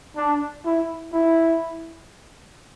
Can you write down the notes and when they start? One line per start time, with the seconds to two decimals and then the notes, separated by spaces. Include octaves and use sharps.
0.16 D4
0.65 E4
1.13 E4